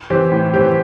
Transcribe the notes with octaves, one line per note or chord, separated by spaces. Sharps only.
E3 C4 G4
A2
E3 C4 G4